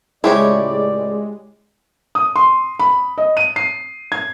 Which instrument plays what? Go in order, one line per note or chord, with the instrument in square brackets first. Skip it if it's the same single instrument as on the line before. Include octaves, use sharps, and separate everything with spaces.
[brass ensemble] C#2 A2 D5 [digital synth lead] G#3 [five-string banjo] E4 G4 C#5
[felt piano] D#6
C6
B5
D#5
D#7
C7
G#6